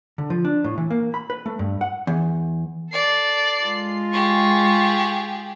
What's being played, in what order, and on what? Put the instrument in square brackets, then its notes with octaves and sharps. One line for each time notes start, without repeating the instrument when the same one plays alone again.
[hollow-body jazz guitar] D3
F3
D4
A2
E3
A#3
B5
B4
A3
G2
F#5
E2
[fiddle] A4 D5 [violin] C7
[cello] G#3 F4
[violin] G4 G#4 [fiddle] C#6